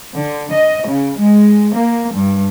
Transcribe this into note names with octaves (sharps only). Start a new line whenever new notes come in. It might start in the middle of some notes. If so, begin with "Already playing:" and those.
D3
D#5
C#3
G#3
A#3
G2